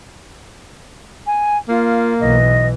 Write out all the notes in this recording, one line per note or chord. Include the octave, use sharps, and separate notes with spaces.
G#5
A#3 F4
B1 E3 D#5